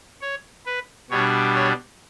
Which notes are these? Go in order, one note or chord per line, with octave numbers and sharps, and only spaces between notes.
C#5
B4
B2 G3 D4 C#5
C#5